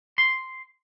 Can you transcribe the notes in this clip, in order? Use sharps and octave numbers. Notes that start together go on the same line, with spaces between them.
C6